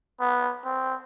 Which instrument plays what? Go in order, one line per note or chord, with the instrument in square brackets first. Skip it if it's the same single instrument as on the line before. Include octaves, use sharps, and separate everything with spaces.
[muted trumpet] B3
C4